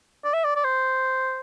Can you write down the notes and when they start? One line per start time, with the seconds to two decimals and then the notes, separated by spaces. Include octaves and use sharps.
0.24 D5
0.34 E5
0.44 D5
0.56 D5
0.64 C5